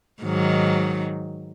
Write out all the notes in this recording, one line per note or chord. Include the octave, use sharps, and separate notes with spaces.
G#2 D#3 F#3